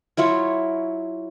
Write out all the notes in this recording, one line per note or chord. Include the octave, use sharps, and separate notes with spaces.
F#3 E4 F4 C#5